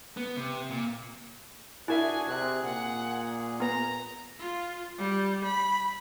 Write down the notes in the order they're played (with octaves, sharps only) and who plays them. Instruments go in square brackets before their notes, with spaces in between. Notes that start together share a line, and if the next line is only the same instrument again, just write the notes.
[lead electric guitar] B3
C3
A#2
[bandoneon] D4 F#4 G#4 [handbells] E4 A#4 E5 [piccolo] G#5
[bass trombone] C3 [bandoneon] G#4 [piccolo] F#6
[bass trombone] A#2 [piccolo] F#5
[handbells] B3 B4 [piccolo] A#5
[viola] F4
G3
B5